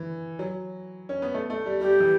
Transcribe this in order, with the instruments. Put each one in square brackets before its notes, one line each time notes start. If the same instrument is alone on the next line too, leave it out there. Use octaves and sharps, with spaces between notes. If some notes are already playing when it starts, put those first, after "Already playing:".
Already playing: [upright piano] E3
F#3
C#4
B3
A3
A3
G3
[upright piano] G3 [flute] G4
[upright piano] E3